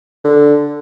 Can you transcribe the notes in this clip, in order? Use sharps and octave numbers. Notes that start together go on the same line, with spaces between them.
D3